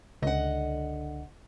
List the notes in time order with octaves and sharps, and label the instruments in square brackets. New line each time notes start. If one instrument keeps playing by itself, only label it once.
[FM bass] C#2 [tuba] D3 [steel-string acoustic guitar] D#5 F#5